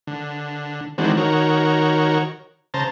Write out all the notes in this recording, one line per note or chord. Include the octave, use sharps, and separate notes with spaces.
D3
D#3 E3 G#3 C4 D4 F#4
D#3 F#4 A#4 C#5
C#3 C5 A5 A#5